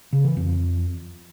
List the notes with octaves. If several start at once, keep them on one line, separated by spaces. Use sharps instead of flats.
C#3
E3
F2